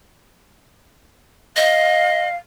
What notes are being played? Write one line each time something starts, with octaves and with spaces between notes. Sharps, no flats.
D#5 F5